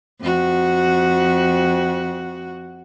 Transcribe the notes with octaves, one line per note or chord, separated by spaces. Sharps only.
F2 F#4